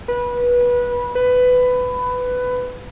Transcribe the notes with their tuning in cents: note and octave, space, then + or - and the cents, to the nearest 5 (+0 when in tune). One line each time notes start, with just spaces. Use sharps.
B4 -20
B4 +15